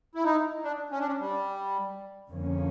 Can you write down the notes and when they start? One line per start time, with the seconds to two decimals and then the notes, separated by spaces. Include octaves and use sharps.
0.15 E4
0.24 D#4
0.64 D4
0.92 C#4
1.00 D4
1.07 C#4
1.20 G3
2.29 F2 D3 F3 A#3 C#4